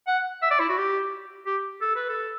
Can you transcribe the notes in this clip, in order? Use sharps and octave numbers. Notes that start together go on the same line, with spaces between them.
F#5
E5
D5
E4
F#4
G4
G4
A4
B4
A4